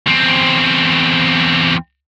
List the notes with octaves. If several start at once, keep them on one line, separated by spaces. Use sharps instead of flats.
E2 C4